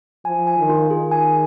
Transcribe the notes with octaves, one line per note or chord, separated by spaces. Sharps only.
F3 G#5
G#5
D#3
F4
D#3 G#4
G#5